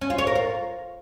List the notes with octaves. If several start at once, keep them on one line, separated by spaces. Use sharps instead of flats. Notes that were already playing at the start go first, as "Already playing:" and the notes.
C#4
F4
C#5
A#4
F4